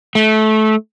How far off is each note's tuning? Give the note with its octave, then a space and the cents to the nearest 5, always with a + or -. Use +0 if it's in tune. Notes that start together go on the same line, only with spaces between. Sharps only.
A3 -20